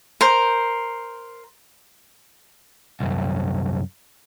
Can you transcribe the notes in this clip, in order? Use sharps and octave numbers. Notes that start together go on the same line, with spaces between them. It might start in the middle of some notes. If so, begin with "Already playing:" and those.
A#4 C5
C2 F#2